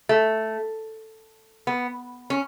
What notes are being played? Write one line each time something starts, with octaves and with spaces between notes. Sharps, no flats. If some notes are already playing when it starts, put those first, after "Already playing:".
A3
B3
C#4